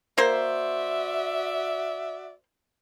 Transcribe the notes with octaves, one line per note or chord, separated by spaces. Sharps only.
A#3 F#4 C5 D5 E5